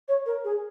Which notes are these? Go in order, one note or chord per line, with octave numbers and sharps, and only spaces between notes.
C#5
A#4
G#4